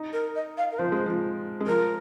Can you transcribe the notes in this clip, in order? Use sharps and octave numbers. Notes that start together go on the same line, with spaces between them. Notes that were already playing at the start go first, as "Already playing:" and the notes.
Already playing: D#4
A#4
D#5
F5
A#4
F3 C5
G#3
F3
G#3
F3 A#4